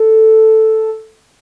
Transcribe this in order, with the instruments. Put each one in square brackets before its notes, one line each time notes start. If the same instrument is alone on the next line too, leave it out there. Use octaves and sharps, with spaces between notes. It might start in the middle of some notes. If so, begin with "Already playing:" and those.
Already playing: [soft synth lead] A4